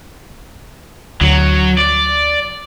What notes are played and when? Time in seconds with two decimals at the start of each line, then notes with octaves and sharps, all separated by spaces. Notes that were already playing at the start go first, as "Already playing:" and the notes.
1.21 D2 F#3
1.79 D5